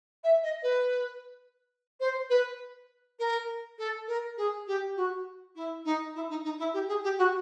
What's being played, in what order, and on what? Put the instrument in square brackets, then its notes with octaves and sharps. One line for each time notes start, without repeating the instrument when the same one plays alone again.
[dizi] E5
D#5
B4
C5
B4
A#4
A4
A#4
G#4
G4
F#4
E4
D#4
E4
D#4
D#4
E4
G4
G#4
G4
F#4